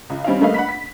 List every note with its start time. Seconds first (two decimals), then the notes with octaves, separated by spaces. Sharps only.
0.10 C#2
0.24 G3 C4 C#4 D#4 F5
0.41 G3 A3 A#3 B4 D#5 F5
0.54 F#5 B5 B6
0.69 B6